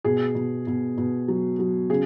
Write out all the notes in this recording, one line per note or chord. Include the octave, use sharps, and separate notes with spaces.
B2 G#4
B2
B2
B2
F#3
F#3
C#3 G#4